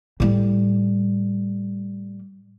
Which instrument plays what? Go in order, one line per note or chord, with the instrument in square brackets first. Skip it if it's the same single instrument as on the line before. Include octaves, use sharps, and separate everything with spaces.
[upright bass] A2 G3